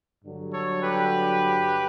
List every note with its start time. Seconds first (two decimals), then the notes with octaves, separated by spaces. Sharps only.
0.24 G2 D3 F#3
0.53 A4 C#5
0.83 G4 B4